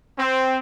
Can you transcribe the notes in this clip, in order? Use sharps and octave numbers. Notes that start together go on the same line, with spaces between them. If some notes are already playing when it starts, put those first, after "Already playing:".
C4